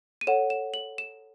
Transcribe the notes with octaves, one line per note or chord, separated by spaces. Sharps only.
D#7
A4 C#5 F#5 E7
E7
F#7
E7